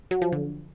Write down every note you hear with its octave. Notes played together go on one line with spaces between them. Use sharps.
F#3
F3
D3